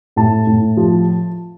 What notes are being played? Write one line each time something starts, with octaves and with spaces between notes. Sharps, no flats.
A2 A5
A2
F3